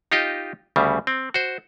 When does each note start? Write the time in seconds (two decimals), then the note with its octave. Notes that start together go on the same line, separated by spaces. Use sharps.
0.12 D#4 F4 G4 D#5
0.76 D2 C#3 G3
1.07 C4
1.34 F#4 C5